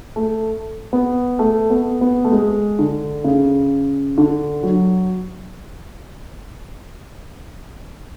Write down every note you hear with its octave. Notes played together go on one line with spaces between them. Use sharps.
A3
B3
A3
B3
B3
A3
G#3
D3
C#3
D3
F#3